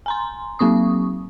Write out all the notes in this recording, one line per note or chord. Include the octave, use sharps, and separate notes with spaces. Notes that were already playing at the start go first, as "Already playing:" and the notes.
G#5 A#5 C6
F#3 A#3 C4 C#6 D#6